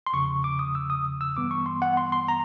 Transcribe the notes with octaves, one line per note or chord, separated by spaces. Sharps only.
C6
E2 C#3 F3 C#6
D6
D#6
E6
D#6
E6
G2 E3 G3 B3 D6
C#6
C6
F#5
C6
C6
A#5